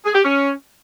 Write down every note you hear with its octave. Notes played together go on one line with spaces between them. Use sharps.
G#4
G4
C#4